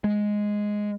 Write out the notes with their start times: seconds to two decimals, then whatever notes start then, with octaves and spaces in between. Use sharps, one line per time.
0.04 G#3